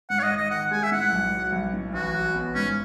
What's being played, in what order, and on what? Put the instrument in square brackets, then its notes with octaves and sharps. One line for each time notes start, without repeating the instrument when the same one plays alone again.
[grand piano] G#2 [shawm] F#5
[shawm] C#5
D#5
[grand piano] G#1
[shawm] D#5
[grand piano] D#3 [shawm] F#5
[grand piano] G#3 [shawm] G#5
[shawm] E5
[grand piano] A2 [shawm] F#5
[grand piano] B1
F#3
B1
A2
[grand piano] A1 [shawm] F#4
[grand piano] F#3
B3
[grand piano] G#2 [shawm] C#4